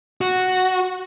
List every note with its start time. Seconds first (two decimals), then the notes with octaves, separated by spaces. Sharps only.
0.21 F#4